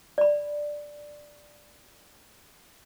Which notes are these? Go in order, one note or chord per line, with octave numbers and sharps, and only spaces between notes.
D5 B5